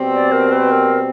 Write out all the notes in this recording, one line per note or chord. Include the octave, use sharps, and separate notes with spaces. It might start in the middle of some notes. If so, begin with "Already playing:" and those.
Already playing: B2 G3 C4
D5
A#4
B4
A#4